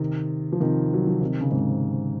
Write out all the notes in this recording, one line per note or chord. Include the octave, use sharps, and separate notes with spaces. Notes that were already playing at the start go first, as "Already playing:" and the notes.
Already playing: C3 D#3
F3
C3 D#3
F#3
F3
C3 D#3
C#3
G#2 C3